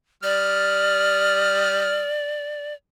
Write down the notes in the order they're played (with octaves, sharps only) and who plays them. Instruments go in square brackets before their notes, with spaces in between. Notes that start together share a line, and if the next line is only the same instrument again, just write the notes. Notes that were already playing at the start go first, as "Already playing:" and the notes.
[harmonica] G3 D#6 F6 [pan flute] D5